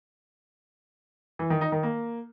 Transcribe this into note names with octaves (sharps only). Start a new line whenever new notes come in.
E3
D#3
D#4
D#3
A#3